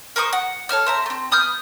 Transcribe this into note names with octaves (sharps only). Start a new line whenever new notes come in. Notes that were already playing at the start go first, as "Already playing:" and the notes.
A#4 C5 C#6 D#6
F#5
A4 C#5 E5 F6
C4 E5 A#5
A3 C4
B3 D#6 F6 G6